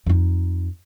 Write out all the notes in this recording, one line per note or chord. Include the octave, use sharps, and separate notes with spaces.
F2 D#4